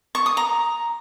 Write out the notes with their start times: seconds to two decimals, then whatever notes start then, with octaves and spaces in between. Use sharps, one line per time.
0.15 C#6
0.26 D#6
0.37 A#5